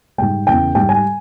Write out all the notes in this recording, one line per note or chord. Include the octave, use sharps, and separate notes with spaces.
G#2 G3 G5
E2 C#3 E3 G5
G#2 G3 G5
G#5